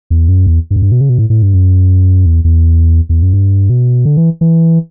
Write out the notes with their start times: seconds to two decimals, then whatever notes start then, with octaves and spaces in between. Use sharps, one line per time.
0.10 E2
0.28 F#2
0.47 E2
0.70 G2
0.76 F#2
0.82 G2
0.92 B2
1.01 C#3
1.09 B2
1.18 A2
1.30 A2
1.42 G2
1.54 F#2
2.26 E2
2.44 E2
3.09 E2
3.22 F#2
3.33 G2
3.70 B2
4.05 D3
4.17 E3
4.41 E3